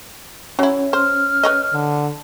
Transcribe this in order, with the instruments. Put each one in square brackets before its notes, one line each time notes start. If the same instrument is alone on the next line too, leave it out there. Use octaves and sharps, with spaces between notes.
[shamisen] F#3 E4 [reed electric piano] C#4
[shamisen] C5 [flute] F6
[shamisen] B4 C#5 D#5
[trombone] D3